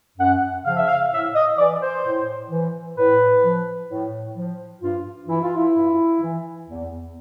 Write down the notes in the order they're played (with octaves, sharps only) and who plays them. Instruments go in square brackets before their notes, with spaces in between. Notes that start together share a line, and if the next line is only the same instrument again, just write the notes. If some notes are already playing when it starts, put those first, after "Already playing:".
[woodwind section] F#2 F#5
C#3 F3 F5
E5
F5
A2 E5
D#5
E3 D5
C5
A2
E3
A2 B4
F3
A2
F3
G2 F4
E3 E4
F4
E4
G2
E3
E2